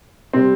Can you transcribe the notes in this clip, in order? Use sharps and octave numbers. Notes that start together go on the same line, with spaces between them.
C3 G3 C4